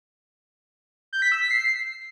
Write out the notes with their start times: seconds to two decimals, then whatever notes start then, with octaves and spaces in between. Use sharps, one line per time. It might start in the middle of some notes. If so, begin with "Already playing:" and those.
1.13 G6
1.22 B6
1.32 E6
1.41 B6
1.51 C7